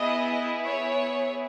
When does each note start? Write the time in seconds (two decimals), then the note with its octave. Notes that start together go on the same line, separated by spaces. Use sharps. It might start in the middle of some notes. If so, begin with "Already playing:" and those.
Already playing: B3 E4 G#4 D#5
0.63 C#5